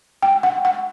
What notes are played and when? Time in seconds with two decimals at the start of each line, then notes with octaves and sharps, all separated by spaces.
0.22 G5
0.43 F#5
0.65 F#5